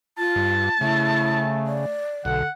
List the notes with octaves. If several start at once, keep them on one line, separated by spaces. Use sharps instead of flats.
F4 A5
G2
C#3 A3 E4
D5
B1 D3 F#5